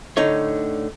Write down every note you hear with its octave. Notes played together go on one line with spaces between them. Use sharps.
A2 D3 D#4 C#5